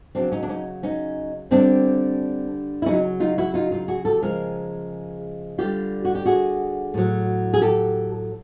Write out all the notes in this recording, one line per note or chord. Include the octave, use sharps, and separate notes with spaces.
C#3 F#3 C4 D4
C#4 D#4
D4
C#4 D#4
C#4 D#4
D3 G3 C4 D4
E4
C#3 F#3 C#4 D#4
D#4 F4
E4 F#4
D#4 F4
D#4 F4
F#4 G#4
G4 A4
C#3 F3 G#3 G#4 A#4
D3 G3 F4 G4
F#4
G4
F#4 G#4
A2 F#3
G#4
G4 A4